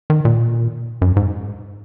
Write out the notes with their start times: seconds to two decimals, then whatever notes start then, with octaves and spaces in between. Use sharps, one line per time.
0.10 D#3
0.25 A#2
1.02 F#2
1.16 G#2